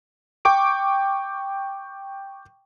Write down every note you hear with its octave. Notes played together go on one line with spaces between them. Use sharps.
G5 C#6 D6 D7